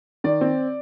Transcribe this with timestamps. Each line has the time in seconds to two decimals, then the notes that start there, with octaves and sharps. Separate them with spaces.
0.24 D#3 D5
0.41 C4